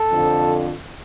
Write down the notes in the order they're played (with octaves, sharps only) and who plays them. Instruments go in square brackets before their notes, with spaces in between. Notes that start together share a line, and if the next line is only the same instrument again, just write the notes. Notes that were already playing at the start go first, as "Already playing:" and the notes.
Already playing: [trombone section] A4
F2 D3 F3